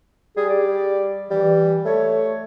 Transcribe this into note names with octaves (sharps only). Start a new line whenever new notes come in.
G3 G#4
D5
E3 G3
A3 C#5